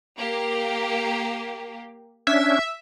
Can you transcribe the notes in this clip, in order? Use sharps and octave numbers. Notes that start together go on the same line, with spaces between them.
A#3 G4
C#4 D4 E5 G#6